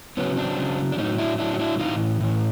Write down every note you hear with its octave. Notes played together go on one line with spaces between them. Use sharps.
C#3 F#3 B3 C#4
C4 D4
C#3 F#3
D4
A2 F#3 C#4 D#4
D4 E4
A2 F#3 D4 E4
D#4
D4 E4
A2 E3 D#4 F4
A2 E3